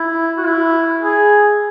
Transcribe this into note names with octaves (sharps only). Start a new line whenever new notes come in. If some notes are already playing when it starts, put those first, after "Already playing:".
Already playing: E4
F#4
E4
G#4